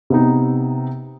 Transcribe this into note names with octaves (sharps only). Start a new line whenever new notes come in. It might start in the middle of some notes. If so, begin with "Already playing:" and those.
C3 B3 D#4